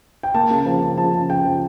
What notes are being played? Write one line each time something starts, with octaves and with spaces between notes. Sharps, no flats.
G5
A#3 A5
C#3
F3 A5
C#3
F3 A5
C#3
C#3 G5
F3